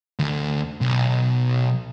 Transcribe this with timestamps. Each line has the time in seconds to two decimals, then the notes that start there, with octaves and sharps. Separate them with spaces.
0.19 D2
0.81 B1